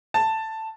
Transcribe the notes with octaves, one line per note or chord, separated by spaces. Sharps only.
A5